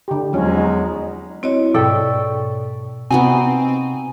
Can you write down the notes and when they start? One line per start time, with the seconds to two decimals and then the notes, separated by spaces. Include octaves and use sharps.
0.08 D3 G4
0.33 E2 F3 F#3 G#3 C#4
0.57 D#4
1.43 C4 E4 F#4 C#5 D#5
1.75 G#2 B2 A4 D5 G5 C#6
3.11 C3 B3 C4 D#4 F#4 G#5